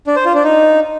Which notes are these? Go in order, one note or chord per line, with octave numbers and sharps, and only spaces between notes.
D4
C5
F4
D4
D#4